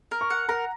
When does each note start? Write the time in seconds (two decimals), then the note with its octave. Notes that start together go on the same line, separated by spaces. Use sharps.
0.11 A#4
0.21 C#6
0.30 F#5
0.49 A#4 A#5